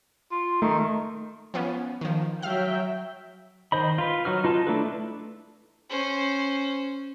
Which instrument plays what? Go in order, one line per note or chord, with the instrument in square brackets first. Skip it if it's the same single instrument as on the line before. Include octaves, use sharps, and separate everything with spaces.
[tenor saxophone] F4
[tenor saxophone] D#3 [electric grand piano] A3
[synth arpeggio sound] F3 B3 C#4
D#3 F3
[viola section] F#3 E5 G5 [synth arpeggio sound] F5 F6
[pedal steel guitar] D#3 C5 D#5 B5
F4 B4
F#3 D#4 F#4 F6
D#4 F4 B4 A5
A3 D4 E4 A4 B4
[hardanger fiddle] C#4 C5